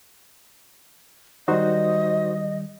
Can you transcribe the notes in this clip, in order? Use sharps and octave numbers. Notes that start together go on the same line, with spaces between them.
D#3 G3 D#4 F#4 C5 D#5